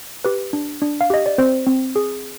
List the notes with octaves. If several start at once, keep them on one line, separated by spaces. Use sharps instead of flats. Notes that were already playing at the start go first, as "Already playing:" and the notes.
G4 B4
D4
D4
F5
G4 D#5
D5
C4 C5
C4
G#4